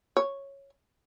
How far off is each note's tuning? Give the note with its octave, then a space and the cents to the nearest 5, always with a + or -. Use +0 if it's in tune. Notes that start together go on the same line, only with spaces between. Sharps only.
C#5 -5